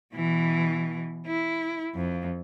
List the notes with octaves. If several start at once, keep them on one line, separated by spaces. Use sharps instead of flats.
B2 E3
E4
F2